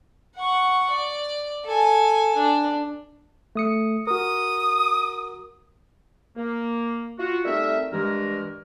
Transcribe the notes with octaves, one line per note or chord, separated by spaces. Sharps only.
F#5 C#6
D5
A4 G#5
D4
A3 D#6 C#7
F#4 A#4 D#6
A#3
F4 F#4
G3 A3 C4 D#4 A#4 E5
G2 E3 G#3 A#4